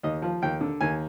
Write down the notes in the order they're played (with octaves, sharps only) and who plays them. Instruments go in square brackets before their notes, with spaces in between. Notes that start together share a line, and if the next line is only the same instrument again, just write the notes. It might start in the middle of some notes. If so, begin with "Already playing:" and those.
[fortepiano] D#2 D#5
F3
D#2 G5
D3
D#2 G#5